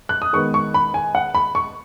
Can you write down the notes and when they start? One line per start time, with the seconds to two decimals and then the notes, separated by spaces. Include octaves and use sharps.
0.09 F#6
0.22 D#6
0.33 D#3 G#3 B3 C#6
0.54 C#6
0.74 B5
0.94 G#5
1.15 F#5
1.35 B5
1.55 C#6